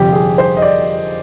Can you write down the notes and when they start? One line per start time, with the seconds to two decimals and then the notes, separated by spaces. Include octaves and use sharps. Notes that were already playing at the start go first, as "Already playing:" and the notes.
Already playing: G1 F2 C3 G4
0.12 G#4
0.38 C5
0.57 D#5
0.62 D5